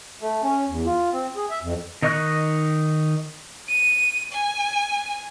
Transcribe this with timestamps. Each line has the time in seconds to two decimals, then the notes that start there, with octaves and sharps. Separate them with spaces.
0.21 A3
0.43 C#4
0.68 E2
0.86 F4
1.12 C4
1.36 G#4
1.50 E5
1.62 F2
2.02 D#3 D#4 D#5 C#6 F#6
3.68 D#7
4.32 G#5